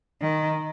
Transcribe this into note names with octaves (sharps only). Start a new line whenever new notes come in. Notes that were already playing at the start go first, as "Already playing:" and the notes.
D#3